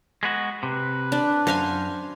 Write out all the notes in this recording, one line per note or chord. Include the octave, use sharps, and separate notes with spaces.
G#3 B3 F#4
C3 B4
D4
F#2 C5 F5 G#5